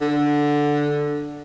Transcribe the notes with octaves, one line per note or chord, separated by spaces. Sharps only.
D3